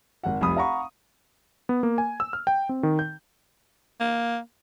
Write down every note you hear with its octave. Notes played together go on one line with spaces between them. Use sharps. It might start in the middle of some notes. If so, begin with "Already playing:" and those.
G#1 F#5
F1 C2 B5 D#6
F5 F#5 A#5 B5 C#6
B3
A#3
G#5
E6
F6
G5
C4
D#3
G6
A#3